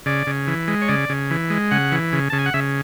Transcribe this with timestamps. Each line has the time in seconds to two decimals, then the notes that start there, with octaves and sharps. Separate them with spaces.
0.06 C#3 D5
0.27 C#3
0.47 E3
0.68 G#3
0.82 C#5
0.88 C#3 D5
1.09 C#3
1.31 E3
1.50 G#3
1.71 C#3 F#5
1.92 E3
2.13 C#3
2.30 C#3 A5
2.39 G#5
2.46 F#5
2.54 C#3 E5